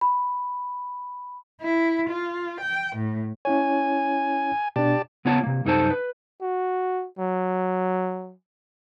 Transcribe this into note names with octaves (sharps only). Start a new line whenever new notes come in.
B5
E4
F4
G5
A2
C#4 E4 C#5 G#5
B2 D4 G4 D5 A5
C#3 B3 F4 C#5 A5
C3 A#3
C2 F#2 D#4 A4 C5 A5
B4
F#4
F#3